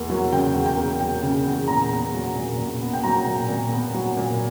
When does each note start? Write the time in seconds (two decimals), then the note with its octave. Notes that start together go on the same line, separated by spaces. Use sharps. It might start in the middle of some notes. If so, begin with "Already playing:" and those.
Already playing: E2 A#3
0.10 F#3
0.32 C#3 G5
0.55 E2
0.66 G5
0.77 A#3
1.00 F#3 G5
1.23 C#3
1.46 E2
1.68 A#2 A#5
1.91 B3
2.14 F#3
2.35 A#2
2.58 A#2
2.81 B3
2.93 G5
3.03 F#3 A#5
3.26 A#2
3.49 A#2
3.72 B3
3.94 F#3
4.17 A#2